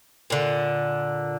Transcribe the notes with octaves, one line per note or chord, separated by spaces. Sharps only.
A#2 D3